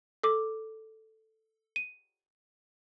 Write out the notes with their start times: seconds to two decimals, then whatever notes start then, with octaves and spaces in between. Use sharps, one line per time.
0.23 A4 D6
1.76 D#7